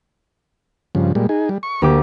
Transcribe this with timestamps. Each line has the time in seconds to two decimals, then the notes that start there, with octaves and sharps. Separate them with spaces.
0.95 G2 C#3 F3
1.15 A#2 G3 G#3
1.29 D#4 G#4
1.49 G3
1.63 C#6
1.82 D2 A#3 G4 D6